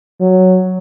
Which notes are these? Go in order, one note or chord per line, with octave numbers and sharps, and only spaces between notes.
F#3